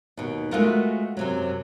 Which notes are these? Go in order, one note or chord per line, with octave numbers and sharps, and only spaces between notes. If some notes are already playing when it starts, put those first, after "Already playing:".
D#2 B2
G#3 A3 B3 F4 F#4 A#4
F#2 C3 F#3